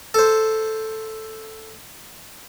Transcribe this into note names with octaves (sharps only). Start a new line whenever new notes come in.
A4 C5